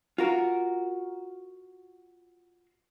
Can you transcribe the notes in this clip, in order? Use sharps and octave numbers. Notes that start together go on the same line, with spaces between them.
F4 F#4 A#4